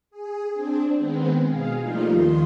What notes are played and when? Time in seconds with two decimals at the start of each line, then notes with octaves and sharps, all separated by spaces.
0.11 G#4
0.53 C4 D4
0.96 D#3 G#3 B3 C4
1.46 B2 G#4 F5
1.77 F3 G3 A3 A#3 D#4 F4
2.08 D#2 D#3 C6